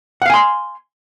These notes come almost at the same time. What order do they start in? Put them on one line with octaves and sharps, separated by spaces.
F#5 F5 G#5 C6